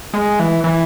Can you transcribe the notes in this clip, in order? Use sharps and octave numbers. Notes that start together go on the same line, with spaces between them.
G#3
E3
E3